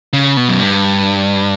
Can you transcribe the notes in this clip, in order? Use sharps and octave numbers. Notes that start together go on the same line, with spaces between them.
C#3
B2
F#2
G2